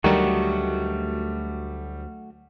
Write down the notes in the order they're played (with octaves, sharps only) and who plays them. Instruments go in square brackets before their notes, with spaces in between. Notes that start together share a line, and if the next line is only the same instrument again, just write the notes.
[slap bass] D2 F#3 [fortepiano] D#3 [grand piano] G3 [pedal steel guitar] A3 F#4